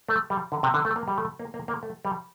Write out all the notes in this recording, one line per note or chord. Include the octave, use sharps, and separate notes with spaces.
A3
G3
D3
C3
D3
A3
A#3
G3
A3
A#3
A#3
A#3
A3
G3